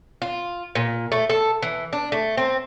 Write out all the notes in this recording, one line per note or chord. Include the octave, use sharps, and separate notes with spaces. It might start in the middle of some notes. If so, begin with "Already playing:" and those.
F4
A#2
A3
A4
E3
D4
A3
C4